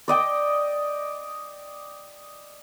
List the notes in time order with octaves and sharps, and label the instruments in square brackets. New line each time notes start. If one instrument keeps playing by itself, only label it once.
[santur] D5 D#5 G5